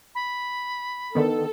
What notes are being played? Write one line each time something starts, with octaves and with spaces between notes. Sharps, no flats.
B5
D3 D#3 B3 A4